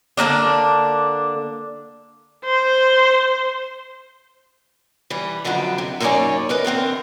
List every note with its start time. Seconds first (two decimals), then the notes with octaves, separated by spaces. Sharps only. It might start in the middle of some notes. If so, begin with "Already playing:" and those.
0.17 D3 A#3 C4 D4
2.45 C5
5.10 E3 G3
5.45 F2 D3 F3 F#3 D4 E4
5.78 C3
6.00 F#2 A#3 D#4 C#5 D5 G#5
6.49 A#4 B4 D#5
6.64 E2 D3 C4 A#4